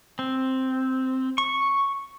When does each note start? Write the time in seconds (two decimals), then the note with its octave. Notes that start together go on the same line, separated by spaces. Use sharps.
0.19 C4
1.38 C#6